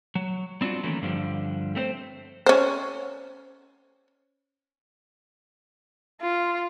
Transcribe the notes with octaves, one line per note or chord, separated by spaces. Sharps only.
F#3
G3 C4 D4 F4 F#4
D#3 E3 F#3 A3 A#3 C#4
G2 D3 F3 G3
A3 C4 A#4 C5
C#4 C5
F4